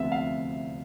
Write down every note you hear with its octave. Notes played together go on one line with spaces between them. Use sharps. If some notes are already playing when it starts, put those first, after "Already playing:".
Already playing: D2 C3 F3 B3 F4 E5
F5